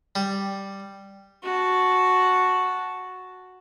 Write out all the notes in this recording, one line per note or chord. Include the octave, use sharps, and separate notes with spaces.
G3
F#4 A5